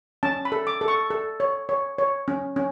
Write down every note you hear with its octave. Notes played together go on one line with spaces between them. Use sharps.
C#4 A5
B5
A4
D6
A4
C#6
A4
C#5
C#5
C#5
C#4
C#4